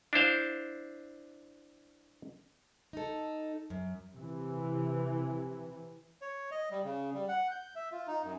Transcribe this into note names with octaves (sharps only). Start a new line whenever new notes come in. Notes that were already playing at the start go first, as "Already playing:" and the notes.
D4 E4 C5 F5
D#4 A4
F#2
C3 E3
C#5
D#5
G3
C#3
G3
F#5
G6
E5
F4
D#4
F#2